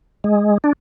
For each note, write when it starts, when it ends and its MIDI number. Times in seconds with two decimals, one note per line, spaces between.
0.24 0.58 56
0.64 0.73 62